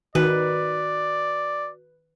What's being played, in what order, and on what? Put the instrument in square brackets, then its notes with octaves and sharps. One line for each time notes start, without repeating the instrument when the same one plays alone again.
[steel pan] D#3 [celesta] F#4 [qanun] B4 [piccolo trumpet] D5